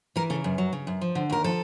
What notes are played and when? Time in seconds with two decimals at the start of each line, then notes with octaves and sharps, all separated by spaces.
0.16 E3 A#4
0.30 C#3 A4
0.44 F#2
0.58 F#3
0.73 C#3
0.87 F#2
1.01 F3
1.15 D3
1.30 D#2 A#4
1.44 F3 A4